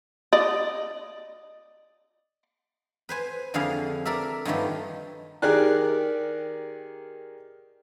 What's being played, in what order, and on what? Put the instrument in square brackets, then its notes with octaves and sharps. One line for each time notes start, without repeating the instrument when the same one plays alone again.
[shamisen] D5 D#5
[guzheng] B4 C5 G#5
F2 D3 F3 E4 G#4 F5
A4 A#4 D5 E5
G2 D#3 F3 F#3 A3
[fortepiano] D#3 G4 G#4 A#4 D5 F#6